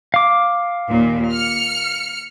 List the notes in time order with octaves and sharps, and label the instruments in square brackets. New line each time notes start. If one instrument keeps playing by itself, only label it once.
[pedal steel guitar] F5 D6
[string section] D#2 A#2
F6 C#7